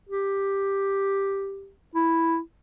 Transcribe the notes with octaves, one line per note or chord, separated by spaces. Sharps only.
G4
E4